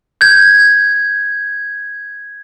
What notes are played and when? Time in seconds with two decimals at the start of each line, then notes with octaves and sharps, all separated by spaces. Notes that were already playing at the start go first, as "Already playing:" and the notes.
0.21 G6 G#6